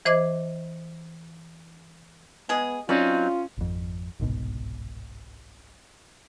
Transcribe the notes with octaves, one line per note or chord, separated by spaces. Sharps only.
E3 C5 D#5 D6 G#6
G#3 B3 G#4
F#3 C4 C#4 D#4 F4 D5
G#1 F2
G1 C2 G#2 B2